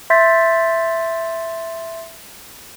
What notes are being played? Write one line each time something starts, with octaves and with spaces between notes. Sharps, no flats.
E5 C6 G6 A6 B6